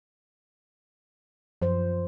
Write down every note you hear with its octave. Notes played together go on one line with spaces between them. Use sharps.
F#2 F3 C5